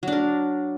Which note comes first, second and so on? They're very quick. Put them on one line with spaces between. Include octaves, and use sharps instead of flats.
F#3 D4 A#4